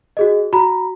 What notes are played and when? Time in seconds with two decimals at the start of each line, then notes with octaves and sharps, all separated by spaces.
0.17 F#4 G#4 D#5
0.53 F#4 A#5 B5